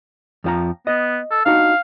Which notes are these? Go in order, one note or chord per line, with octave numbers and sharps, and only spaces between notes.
F2 F3 A#5
B3 D#5
A4
D4 D#4 F#4 F5